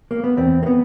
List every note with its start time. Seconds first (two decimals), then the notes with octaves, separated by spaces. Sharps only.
0.11 A#3
0.24 B3
0.37 E2 C4
0.63 A#3
0.66 B3